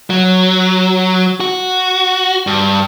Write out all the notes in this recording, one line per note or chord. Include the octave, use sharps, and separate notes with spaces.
F#3
F#4
G2